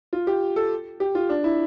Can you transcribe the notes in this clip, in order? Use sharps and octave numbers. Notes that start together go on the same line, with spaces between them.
F4
G4
A4
G4
F4
D4
E4